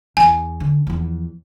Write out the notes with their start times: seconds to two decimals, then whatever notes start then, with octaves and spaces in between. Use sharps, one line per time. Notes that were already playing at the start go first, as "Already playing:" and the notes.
0.17 E2 G#5
0.60 D3
0.87 E2 F3